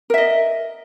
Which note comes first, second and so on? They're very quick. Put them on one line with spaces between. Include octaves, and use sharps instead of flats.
A#4 E5 D#5